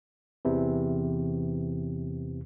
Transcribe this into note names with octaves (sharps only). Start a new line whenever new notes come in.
E2 C3 E3